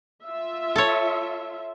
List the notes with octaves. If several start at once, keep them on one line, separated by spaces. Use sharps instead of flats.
F4 E5
A4 C#5